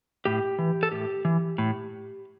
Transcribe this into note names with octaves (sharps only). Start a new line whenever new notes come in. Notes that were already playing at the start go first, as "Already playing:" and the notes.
A2 G4
E3
A4
A2 G4
E3
A2